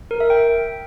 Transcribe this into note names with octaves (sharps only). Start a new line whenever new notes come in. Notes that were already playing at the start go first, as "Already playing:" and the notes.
A#4
E5
G5